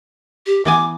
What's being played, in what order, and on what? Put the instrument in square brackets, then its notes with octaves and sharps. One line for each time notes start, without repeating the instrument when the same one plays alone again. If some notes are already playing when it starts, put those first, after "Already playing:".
[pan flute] G4
[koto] E3 B3 G#5 [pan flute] D6